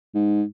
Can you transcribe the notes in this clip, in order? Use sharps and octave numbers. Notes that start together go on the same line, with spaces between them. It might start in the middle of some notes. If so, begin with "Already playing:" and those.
G#2